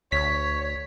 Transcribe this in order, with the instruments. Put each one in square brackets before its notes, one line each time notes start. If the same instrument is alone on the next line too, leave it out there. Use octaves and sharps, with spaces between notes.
[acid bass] D2 [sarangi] C#5 [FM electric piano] B6